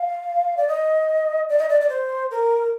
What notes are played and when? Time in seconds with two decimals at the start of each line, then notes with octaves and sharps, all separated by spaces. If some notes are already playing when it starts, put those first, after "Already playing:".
Already playing: F5
0.57 D5
0.68 D#5
1.49 D5
1.59 D#5
1.69 D5
1.81 D5
1.89 C5
2.31 A#4